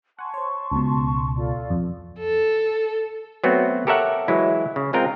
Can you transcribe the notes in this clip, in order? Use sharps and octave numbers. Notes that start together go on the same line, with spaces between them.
F#5 G#5 A5 C6 C#6
C5 C#5
C#2 B2
F4 A4 D5
F2
A4
F#3 A3 B3 C4 F#4
G4 A4 A#4 C#5 E5 F#5
E3 F#3 G#3 E4
C#3
G#3 C4 F4 A#4 G5